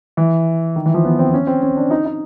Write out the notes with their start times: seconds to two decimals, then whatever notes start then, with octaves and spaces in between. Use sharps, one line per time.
0.17 E3
0.76 D#3
0.86 E3
0.94 F3
1.05 B3
1.19 C4
1.34 C#4
1.47 C4
1.62 C#4
1.77 D4
1.91 D#4
2.05 D#4